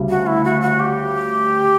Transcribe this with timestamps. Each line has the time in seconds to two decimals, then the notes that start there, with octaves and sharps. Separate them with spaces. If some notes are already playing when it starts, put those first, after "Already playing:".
Already playing: D2 C#3 G3
0.10 F#4
0.27 E4
0.45 F#4
0.61 F#4
0.80 G4